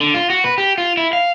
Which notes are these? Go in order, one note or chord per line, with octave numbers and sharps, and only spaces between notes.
D3
F4
F#4
B4
G4
F4
E4
F5